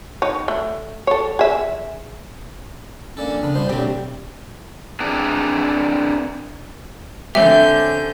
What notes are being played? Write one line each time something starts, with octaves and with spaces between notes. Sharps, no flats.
D#4 C#5
A3
A4 C#5
G#4 E5
A#3 C#4 D4 A4
F2
C#3 B3 D4
B2 G3 B3 C5
D2 B2 D3 F#3 C4 G4
C4 D4 G#4 A#4 B4 D5
D3 C4 C#4 G4 E5 G6